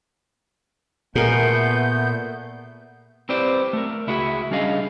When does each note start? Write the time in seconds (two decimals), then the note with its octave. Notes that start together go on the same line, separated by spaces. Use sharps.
1.15 A#2 A3 B3 G#4 A#4 G6
3.29 C4 E4 G4 B4 C5 D5
3.73 A3 A#4
4.07 C#2 E4 F#4 G#4 E5
4.51 G3 C#4 D4 G#4 D#5 F5